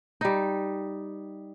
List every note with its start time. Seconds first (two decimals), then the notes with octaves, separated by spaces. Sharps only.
0.21 G3 D#4